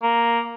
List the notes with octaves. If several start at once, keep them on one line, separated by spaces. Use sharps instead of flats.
A#3